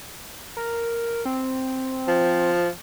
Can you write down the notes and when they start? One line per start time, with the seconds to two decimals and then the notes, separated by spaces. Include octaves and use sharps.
0.57 A#4
1.25 C4
2.07 F3